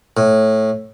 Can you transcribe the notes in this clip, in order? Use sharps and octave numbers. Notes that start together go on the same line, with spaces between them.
A2